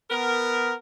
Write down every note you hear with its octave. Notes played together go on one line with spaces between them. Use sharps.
B3 A#4